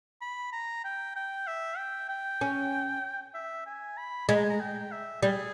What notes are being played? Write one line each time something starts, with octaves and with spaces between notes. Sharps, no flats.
B5
A#5
G5
G5
E5
G5
G5
C#4
E5
G#5
B5
G#3 B5
A#5
G#5
A#5
G5
E5
G3 G#4